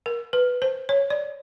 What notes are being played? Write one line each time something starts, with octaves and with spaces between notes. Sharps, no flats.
A#4
B4
C5
C#5
D5